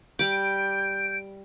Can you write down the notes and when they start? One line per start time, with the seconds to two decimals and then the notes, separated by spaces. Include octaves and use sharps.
0.19 G3 D6 G6 D7